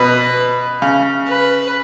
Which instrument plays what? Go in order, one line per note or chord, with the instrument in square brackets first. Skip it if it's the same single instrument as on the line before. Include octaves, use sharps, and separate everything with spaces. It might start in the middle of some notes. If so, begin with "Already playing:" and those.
Already playing: [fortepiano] B2 [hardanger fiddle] B4
[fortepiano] C#3
[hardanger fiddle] B4